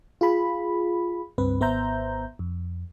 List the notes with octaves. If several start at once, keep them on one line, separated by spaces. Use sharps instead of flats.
F4 G#4 B5
C#2 G2 C4 B4
G#1 B3 C5 E5 A#5 G6
F2